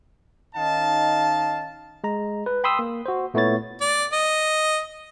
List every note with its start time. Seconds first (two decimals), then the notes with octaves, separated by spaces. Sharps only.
0.55 D#3 C#4 D#4 D#5 F5 A5
2.04 G#3 A#5
2.46 B4
2.64 G5 B5 C6 D#6 E6
2.79 A#3
3.06 F#4 C5
3.34 A#2 A3 B3 E4 C#5 A6
3.81 D5
4.12 D#5